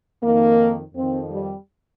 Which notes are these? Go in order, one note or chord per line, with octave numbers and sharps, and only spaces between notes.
F2 D#3 A#3
F2 D#3 C4
G3